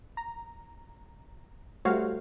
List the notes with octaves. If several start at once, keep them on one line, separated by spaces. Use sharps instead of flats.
A#5
G3 A3 F#4 C5 C#5 F5